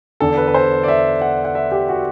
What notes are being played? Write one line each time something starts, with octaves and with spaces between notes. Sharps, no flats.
E2 D3 A4
B4
B4
C5
D5
E5
F#5
F#5
E5
G4
F#4